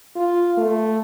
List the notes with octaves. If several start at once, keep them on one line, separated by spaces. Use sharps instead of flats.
F4
A3